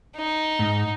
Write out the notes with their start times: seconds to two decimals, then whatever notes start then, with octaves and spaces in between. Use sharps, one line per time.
0.16 D#4
0.59 G#2